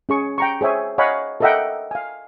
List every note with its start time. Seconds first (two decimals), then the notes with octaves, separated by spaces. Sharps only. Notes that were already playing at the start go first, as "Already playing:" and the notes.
0.09 C#4 G#4 C#6
0.38 G5 A#5 C#6
0.61 G#4 C5 C#5 E5 G#5
0.98 C#5 D#5 F5 F#5 G#5 B5
1.40 A4 A#4 D#5 E5 F#5 G5
1.91 F5 G#5